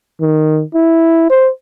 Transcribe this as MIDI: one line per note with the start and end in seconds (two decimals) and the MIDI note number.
0.21 0.63 51
0.75 1.28 64
1.30 1.50 72